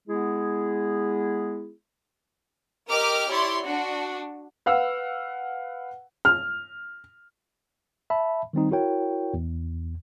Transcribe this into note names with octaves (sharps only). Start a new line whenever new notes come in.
G#3 B3 E4 G#4
G4 A#4 D#5 D6 F6
E4 G4 C#5 D5 C6
D4 F#4
B4 F5 F#5 E6
F6
E5 A5 B5
D#3 G3 C4 D#4
E4 F#4 A#4 C#5 G5
E2